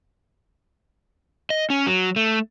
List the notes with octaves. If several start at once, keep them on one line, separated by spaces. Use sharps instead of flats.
D#5
C#4
F#3
A3